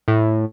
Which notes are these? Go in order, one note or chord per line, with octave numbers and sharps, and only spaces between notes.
A2